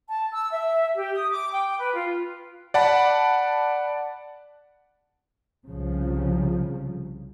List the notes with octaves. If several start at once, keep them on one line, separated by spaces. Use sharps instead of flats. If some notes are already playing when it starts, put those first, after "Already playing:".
A5
E6
E5
G4
D#6
D6
G5
B4
F4
D5 F#5 A5 B5
C2 C#3 F3